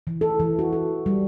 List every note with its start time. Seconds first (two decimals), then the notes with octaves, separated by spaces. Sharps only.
0.07 E3
0.21 A4
0.40 E3
0.59 F#4
0.73 A4
1.06 G3